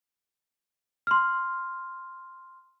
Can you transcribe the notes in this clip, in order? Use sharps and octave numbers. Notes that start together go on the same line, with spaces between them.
C6 F6